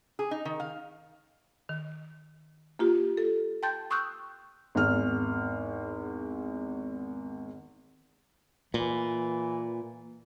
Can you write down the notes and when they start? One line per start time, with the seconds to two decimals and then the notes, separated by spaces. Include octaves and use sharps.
0.19 G#4
0.31 D#4
0.45 D#3
0.60 F5
1.69 D#3
2.79 A#3 F4 G4
3.17 A4
3.63 G5 A5 C6 G6 A6
3.90 C6 C#6 D#6 E6 F#6 G6
4.75 G#1 E2 F6
8.74 A#2 E3